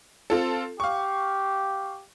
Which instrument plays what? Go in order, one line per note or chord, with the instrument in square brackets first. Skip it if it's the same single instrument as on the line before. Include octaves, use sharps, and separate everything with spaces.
[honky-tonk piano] C4 F4 A4
[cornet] G4 [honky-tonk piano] F5 C#6